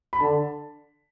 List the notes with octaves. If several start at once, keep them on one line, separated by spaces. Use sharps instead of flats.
B5
D3 A5